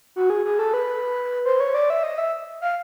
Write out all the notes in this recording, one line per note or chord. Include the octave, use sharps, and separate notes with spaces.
F#4
G#4
G#4
A4
B4
C5
C#5
D5
E5
D#5
E5
F5